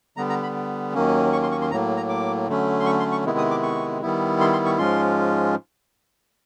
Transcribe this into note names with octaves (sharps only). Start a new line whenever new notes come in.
D3 G3 B3 A#5
A#5
B5
D#2 D#3 F#3 A#3 C#4
C#6
C6
C#6
C6
A2 F#3 A#3 A#5
A#5
D6
D3 F#3 A3 C#4
C6
C#6
C6
C#6
C3 D#3 G#3 B3 E4
D#6
D6
C#6
D#3 G3 B3 E4
C6
C6
C#6
G#2 F3 G#3 C#4 F4 C6